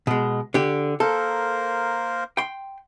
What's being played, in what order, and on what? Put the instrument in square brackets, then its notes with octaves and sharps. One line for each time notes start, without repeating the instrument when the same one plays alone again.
[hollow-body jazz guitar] B2 G#3
D3 G4
[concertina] A#3 A#4 C5 [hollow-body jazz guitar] A4
[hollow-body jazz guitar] G5 C6